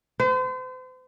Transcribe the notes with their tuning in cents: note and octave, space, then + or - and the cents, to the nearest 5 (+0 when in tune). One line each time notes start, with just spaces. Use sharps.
C5 -40